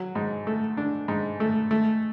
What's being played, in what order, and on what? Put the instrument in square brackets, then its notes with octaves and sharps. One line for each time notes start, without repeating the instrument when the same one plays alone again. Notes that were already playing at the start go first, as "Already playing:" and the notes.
Already playing: [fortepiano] F#3
G#2
A3
D4
G#2
A3
A3